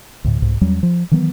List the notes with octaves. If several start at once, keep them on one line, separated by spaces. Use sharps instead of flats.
D2 A2
C2 G#2
E2 F#3 G3 C#4
F3
D#3 E3 F#3 B3